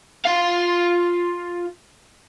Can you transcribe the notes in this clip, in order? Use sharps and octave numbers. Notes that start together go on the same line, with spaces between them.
F4 F5